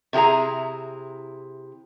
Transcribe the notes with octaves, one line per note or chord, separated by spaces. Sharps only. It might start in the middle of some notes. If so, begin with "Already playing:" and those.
C3 E4 G4 G#4 A#5